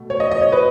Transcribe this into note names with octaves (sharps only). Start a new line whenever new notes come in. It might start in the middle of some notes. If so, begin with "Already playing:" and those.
Already playing: B2 A3
C#5
D#5
D#5
C#5
B4